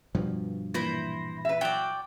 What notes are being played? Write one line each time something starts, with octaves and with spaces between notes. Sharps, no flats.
G2 B2 F3
A#2 E3 E4 C5 A#6
B4 E5
F#3 D5 G5